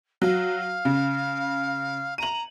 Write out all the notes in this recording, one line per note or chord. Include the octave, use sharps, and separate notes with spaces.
F#3 F5
C#3
A#5 D#7 F#7